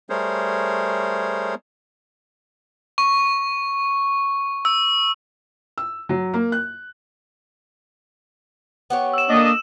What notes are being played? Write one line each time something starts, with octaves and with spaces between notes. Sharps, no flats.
G3 A3 G#4 A#4 C5 C#5
C#6
E6
E6
F#3
A#3
F#6
B3 G4 C#5
E6 E7
A#3 D4 A4 D#5